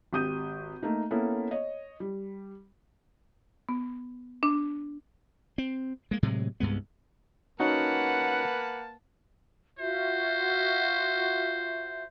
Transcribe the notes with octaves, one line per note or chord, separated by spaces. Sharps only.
G#1 G4 D#6 G6 D#7
A3 A#3 D#4
A#3 B3 C#4 E4 A4
C#5 D#5
G3
B3
D4
C4
G#3 A#3
A2 C3 F#3 G#3
C2 G2 G#3 B3
A#3 C#4 D#4 F#4 B4 F#5 A5
F4 F#4 C5 E5